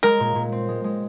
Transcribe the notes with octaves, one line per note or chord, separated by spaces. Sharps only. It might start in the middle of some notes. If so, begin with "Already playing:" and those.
G#3 A#4
A#2
A#2
C4
G#3
G#3